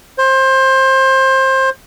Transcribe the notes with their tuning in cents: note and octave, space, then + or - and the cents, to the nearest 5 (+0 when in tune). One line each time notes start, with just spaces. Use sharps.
C5 +20